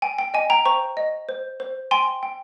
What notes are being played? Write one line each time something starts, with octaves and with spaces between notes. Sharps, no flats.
G5 G#5
G5
D#5 G#5
G5 A#5
C5 A#5 C#6
D#5
C5
C5
G5 G#5 C6
G5